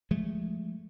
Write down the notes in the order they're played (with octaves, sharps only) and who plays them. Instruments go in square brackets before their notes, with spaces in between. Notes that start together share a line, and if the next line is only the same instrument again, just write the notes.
[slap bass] F3 G#3 A3